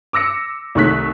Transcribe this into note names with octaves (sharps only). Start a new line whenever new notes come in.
D6 E6 A#6 C#7
C2 D#3 A3 C#6 F#6 B6